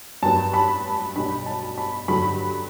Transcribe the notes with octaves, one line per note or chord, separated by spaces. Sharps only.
G2 F#3 B3 A5
B5
B1 B2 G3 D4 B5
A5
B5
G2 D3 F#3 B5